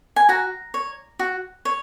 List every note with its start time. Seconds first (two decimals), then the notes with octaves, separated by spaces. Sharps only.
0.16 G#5
0.29 F#4 A#5
0.74 C#5
1.19 F#4
1.65 C#5